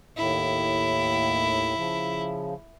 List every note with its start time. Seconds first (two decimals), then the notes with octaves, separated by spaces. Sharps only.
0.17 D#2 A2 E4
1.77 C#3 F3